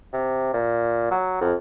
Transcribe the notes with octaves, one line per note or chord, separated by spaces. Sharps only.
C3
A#2
F#3
F2